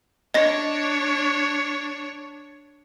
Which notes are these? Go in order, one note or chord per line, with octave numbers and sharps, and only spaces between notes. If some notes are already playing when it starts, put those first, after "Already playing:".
D4 C#5 D#5 A#6